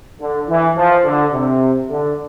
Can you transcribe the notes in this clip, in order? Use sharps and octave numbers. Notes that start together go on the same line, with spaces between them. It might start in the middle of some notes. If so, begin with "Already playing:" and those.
D3
E3
F3
D3
C3
D3